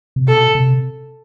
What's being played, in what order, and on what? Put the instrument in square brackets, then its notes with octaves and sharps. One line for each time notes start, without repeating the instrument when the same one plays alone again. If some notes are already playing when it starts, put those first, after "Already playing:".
[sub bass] C3
[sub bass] B2 [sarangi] A4
[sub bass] C3